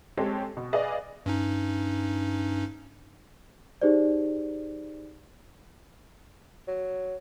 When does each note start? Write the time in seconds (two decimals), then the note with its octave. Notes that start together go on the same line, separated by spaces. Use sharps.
0.17 G#3 C4 G4 A4 C#5
0.57 B2
0.73 G#4 B4 D5 D#5 F5 G#5
1.26 G2 C#4 D#4
3.82 D#4 G4 G#4 C5 D5
6.68 F#3